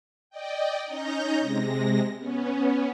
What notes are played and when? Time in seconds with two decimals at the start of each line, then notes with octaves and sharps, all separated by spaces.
0.30 D5 D#5 G5
0.86 C#4 D#4 D#5 A#5 G6 A#6
1.40 C3 G#3 A#6
2.18 B3 C#4